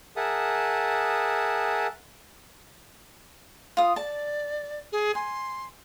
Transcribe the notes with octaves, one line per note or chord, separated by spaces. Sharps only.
G#4 A#4 E5 F#5 A5 D#6
F4 D#6
D5 A5
G#4
G#5 C6